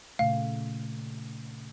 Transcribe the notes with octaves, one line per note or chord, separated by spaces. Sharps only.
A#2 C#3 A3 F5